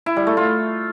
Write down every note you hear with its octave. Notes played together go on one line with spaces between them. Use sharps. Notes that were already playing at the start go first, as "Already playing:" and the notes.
E4
G3
A3
F4